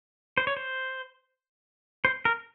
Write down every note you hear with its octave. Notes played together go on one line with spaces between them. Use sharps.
C5
C#5
C5
C5
A#4